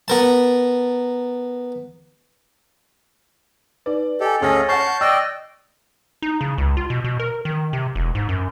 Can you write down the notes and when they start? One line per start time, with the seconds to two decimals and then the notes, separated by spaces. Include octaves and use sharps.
0.08 B3 A#4 A5
3.86 D#4 B4 D5
4.21 G4 A4 D#5 G#5
4.41 D2 C#4 G#4 A4 F6 A#6
4.69 C#5 F#5 A5 C#6 G6 C7
5.01 D5 D#5 G5 E6 F#6 A#6
6.22 D#4
6.41 C#3
6.58 C#2
6.77 F4
6.90 B2
7.04 B2
7.20 A#4
7.45 D#3
7.73 C3
7.95 E1
8.15 G#2
8.29 F#2